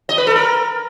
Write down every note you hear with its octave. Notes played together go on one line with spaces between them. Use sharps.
D#5
B4
A4
A#4